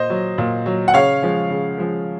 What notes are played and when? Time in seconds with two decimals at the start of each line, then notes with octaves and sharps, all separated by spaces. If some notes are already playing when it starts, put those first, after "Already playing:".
Already playing: A#2 C5 D#5
0.10 F#3
0.38 A#2
0.66 F#3
0.88 F#5
0.94 C#3 C#5 F5
1.23 F3 G#3
1.50 C#3
1.78 F3 G#3